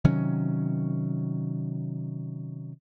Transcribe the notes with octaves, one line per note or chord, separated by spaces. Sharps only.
C3 D#3 F#3 C#4